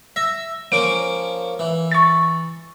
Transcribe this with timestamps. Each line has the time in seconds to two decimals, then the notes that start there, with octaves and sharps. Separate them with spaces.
0.16 E5 A#6
0.72 F3 A#3 C#4 D7
1.59 E3
1.92 C#6 A6